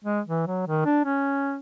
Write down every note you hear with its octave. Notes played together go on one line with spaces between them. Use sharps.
G#3
E3
F#3
D#3
D4
C#4